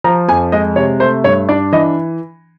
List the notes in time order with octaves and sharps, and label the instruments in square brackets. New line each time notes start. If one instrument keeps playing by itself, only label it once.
[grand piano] F3 A#5
F2 G#5
G#3 D#5
C3 C#5
A3 C5
G2 C#5
D4 D5
E3 D#5